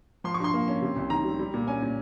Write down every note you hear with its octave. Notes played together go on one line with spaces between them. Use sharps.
F3 C6
C#6
G2 C6
A#3
C#4
C3
C2
D#3 A#5
G3
G3
A#2
C#4 G#5
A#2